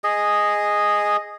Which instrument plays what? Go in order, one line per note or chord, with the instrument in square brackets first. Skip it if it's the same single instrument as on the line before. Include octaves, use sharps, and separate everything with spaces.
[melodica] G#4 D#5